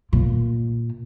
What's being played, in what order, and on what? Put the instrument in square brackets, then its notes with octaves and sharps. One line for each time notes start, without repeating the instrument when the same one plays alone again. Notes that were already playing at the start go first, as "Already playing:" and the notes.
[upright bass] A#2